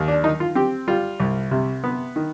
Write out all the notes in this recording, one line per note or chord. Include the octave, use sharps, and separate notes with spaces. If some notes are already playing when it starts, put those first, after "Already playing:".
Already playing: D#2
D4
D#3 D#4
F4
C4 G4
G3 F4
C2
C3
B3
D#3